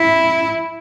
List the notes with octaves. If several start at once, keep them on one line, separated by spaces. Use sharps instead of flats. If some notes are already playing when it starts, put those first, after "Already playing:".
Already playing: E4